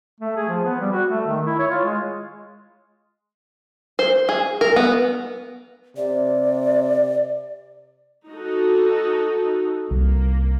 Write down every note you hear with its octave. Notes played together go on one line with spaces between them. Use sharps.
A3
G#4
F3
B3
G3
F#4
A3
D#3
E4
C#5
F4
G#3
C5
G#4
A#4
B3
C3 D5
D#4 F#4 A4
C2 A#3